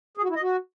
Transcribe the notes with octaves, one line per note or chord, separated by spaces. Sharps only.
G#4
F#4
E4
D#5
F#4